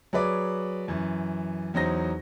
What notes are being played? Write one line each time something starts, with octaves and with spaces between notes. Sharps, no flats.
F#3 G#4 B4 D5
F#2 E3
E2 F#3 D#4 C5 A#6